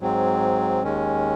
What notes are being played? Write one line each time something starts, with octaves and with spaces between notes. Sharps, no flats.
G#2 F#3 C4
D#2 D#3 G#3 C#4